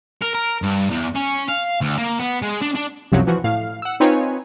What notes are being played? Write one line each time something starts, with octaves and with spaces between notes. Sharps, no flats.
A#4
A#4
G2
E2
C#4
F5
D2
A#3
B3
G#3
D4
D4
C2 F#2 C3 F3 F#3
E3 F3 F#4
A2 F5
F#5 E6
C4 D#4 F4 B4 C#5 G#5